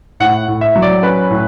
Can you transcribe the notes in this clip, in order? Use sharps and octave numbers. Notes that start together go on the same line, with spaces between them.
A2 F#5
A2
E5
F#3
D5
C#4 B4
A2